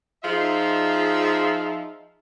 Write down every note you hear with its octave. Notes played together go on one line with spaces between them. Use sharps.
F3 D#4 F4 G#4 E5